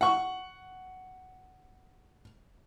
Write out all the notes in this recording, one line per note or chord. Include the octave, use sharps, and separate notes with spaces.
F#5 C#6